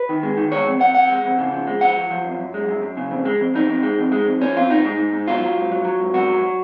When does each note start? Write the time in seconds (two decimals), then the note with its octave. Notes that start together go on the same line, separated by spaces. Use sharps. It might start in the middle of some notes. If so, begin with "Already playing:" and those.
Already playing: B4
0.09 D#3
0.23 G#3
0.37 D#3
0.52 G#3 C#5
0.67 F2
0.80 F2 F#5
0.95 F2 F#5
1.09 G#3
1.24 F2
1.38 C#3
1.53 F3
1.67 G#3
1.81 F3 F#5
1.96 F3
2.11 F3
2.24 F#2
2.40 F#2
2.54 G#3
2.68 F#2
2.82 F#2
2.97 C#3
3.11 F2
3.25 G#3
3.40 F2
3.54 F2 D#4
3.69 F2
3.83 G#3
3.99 F2
4.12 G#3
4.26 F2
4.41 F3 C#4
4.56 F2 F4
4.70 F2 D#4
4.85 G#2
4.98 G#2
5.13 G#2
5.28 F#3 F4
5.42 F#3
5.57 G#2
5.72 F#3
5.85 F#3
6.00 G#2
6.14 G#2 F#4
6.29 F#3
6.43 F#3